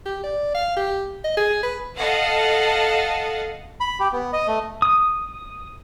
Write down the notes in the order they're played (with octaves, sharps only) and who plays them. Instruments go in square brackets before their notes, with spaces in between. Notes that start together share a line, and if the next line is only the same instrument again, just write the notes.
[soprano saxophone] G4
D5
F5
G4
D#5
G#4
B4
[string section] A4 D#5 F5 F#5
[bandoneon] B5
G4
B3
D#5
A3
[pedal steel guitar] D#6